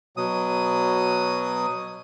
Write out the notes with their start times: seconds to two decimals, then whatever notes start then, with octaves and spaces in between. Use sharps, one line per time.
0.17 B2 F#3 D#6